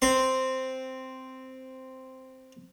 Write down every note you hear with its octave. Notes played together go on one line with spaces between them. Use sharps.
C4 C6